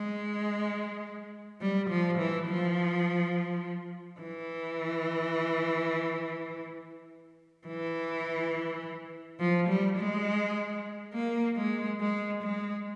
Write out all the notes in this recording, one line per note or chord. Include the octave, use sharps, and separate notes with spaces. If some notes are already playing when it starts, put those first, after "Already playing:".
Already playing: G#3
G3
F3
E3
F3
E3
E3
F3
G3
G#3
A#3
G#3
G#3
G#3